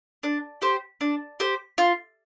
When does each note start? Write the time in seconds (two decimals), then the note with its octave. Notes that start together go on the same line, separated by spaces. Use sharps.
0.23 D4
0.62 G4 C5
1.01 D4
1.40 G4 C5
1.78 F4